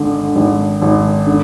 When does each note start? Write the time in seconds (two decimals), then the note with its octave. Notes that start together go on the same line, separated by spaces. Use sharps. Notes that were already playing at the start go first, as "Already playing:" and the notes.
Already playing: G#1 D3
0.35 G#1
0.81 G#1
1.27 D3